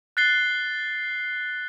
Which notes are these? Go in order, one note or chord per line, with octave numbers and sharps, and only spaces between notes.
F#6 A6 C7 G7